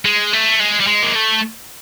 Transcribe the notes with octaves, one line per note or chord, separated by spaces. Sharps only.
G#3
A3
G#3
G3
G#3
A#3
A3